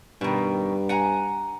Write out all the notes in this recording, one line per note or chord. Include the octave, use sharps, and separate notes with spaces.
G2 B2 D#3
F#5 G#5 A#5